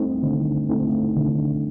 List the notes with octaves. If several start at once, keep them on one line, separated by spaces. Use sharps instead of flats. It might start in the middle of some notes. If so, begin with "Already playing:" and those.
Already playing: A3 C4 D#4
D3
A3 C4 D#4
D3